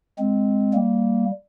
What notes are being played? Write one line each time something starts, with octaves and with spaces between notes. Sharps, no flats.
G#3 C4
G3 A#3